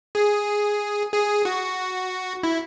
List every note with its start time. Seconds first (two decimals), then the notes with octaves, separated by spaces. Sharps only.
0.15 G#4
1.12 G#4
1.45 F#4
2.43 E4